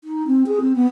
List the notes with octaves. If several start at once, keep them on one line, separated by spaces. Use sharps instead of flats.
D#4
C4
G#4
C4
B3